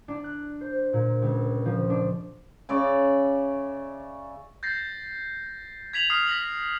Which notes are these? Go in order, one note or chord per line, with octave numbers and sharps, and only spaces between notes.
D4
F#6
C5
A#2
C#2
F3
D4
C#3 D5 E5 C#6
G6 A6 A#6 C7
G#6 B6 F7 F#7
D#6 F6 B6 C7
A#6 B6 F#7